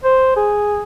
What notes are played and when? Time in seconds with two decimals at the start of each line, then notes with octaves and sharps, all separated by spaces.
0.04 C5
0.36 G#4